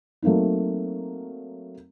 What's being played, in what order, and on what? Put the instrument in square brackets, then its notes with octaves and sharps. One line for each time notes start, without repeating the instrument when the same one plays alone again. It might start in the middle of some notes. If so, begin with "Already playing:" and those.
[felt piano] F#3 A3 A#3 C4 D#4